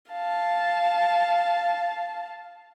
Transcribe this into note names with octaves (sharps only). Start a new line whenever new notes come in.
F5 A5